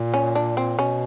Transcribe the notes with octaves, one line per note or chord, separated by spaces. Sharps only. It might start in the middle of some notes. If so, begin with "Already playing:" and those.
Already playing: A#2
C#4
D4
C4
B2 C#4